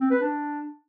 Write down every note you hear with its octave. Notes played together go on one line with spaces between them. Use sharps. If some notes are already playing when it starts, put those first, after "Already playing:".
C4
B4
D4